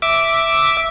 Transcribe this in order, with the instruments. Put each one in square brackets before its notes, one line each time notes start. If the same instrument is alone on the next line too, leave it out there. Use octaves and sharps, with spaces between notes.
[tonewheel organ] E5 D6